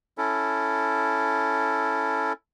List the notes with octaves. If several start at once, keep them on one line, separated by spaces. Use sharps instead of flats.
C#4 E4 A4